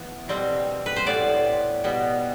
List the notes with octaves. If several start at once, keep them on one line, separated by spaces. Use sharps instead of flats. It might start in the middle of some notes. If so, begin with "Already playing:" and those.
Already playing: E3 B3
B2 G3 C4
B4
C5
A2 G3 B3 D5
B2 G3 B3